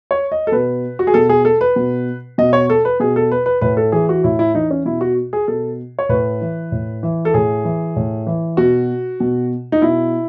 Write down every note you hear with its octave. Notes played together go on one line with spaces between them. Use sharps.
C#5
D#5
A4
B2 B4
F#4
G#4
B2 A4
G#4
A4
B4
B2
B2 D#5
C#5
A4
B4
B2 G#4
A4
B4
B4
A2 B4
A4
E3 G#4
F#4
A2 E4
E4
E3 D#4
C#4
B2 E4
F#4
G#4
B2 A4
C#5
A2 B4
E3
A2
E3
A4
A2 G#4
E3
A2
E3
B2 F#4
B2
D#4
B2 E4